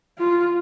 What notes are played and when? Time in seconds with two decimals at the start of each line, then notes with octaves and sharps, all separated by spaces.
0.19 F4